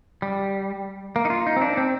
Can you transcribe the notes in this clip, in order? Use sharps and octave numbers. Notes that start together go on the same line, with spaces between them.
G3
A#3
D#4
F4
D#4
C4
D4
C4